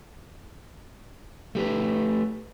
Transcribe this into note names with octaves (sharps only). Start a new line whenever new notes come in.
A3 G4 B4